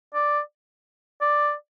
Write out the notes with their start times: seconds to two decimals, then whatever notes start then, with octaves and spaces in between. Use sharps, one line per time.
0.14 D5
1.21 D5